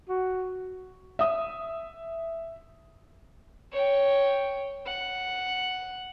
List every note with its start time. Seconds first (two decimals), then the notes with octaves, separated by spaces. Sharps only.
0.09 F#4
1.19 E5 D#6
3.72 C#5 G5
4.86 F#5